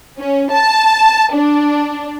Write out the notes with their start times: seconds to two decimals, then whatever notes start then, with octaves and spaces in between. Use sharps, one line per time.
0.19 C#4
0.52 A5
1.34 D4